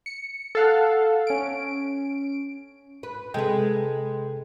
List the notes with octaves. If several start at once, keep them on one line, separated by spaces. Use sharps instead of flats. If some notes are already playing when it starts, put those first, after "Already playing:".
C#7
A4 F5 F#5
C#4 D7
B4
C3 G#3 A4 B4 G5